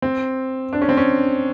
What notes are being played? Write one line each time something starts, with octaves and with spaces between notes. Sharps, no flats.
C4
D4
C#4
C4
C#4